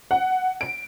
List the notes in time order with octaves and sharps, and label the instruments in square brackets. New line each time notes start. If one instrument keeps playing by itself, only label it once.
[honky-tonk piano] F#5
D7